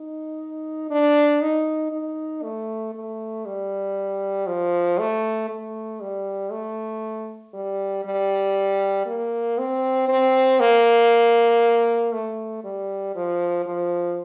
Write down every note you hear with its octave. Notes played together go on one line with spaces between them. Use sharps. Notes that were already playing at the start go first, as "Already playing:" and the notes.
Already playing: D#4
D4
D#4
D#4
A3
A3
G3
F3
A3
A3
G3
A3
G3
G3
A#3
C4
C4
A#3
A3
G3
F3
F3